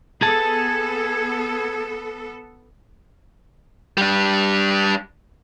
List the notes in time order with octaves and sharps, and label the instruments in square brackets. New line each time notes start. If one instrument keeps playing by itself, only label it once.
[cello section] B3 A4 [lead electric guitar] G#4 A5
[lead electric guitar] G3 D4